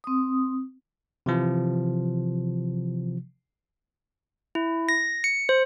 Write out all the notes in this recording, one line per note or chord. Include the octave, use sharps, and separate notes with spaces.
C4 D#6
C3 E3 F3
E4
A#6
C#7
C5